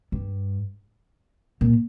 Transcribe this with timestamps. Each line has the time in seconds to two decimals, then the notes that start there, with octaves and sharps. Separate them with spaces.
0.12 G2
1.61 A#2